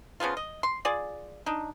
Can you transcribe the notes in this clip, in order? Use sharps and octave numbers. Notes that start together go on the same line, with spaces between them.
C#3 F3 B3 F4
D#5
C6
F4 G#4 D5
D4 D#4